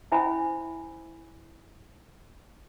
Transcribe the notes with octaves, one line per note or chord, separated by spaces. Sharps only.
C#4 E4 C5 E5 G#5 B5